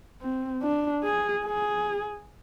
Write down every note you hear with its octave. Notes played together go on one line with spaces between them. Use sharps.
C4
D4
G#4
G#4